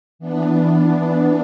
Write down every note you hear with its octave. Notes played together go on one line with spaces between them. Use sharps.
E3 B3 D4